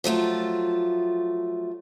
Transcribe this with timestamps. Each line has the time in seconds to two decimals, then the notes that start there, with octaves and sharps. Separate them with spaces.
0.04 F3 F#3 A3 F4